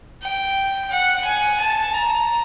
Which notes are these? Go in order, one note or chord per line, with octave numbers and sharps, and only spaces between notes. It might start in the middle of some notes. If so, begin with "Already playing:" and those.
G5
F#5
G#5
A5
A#5